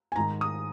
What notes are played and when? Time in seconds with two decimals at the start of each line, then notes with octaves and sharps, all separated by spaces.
0.12 G#5
0.16 G#2 D#3 A#5
0.41 D#6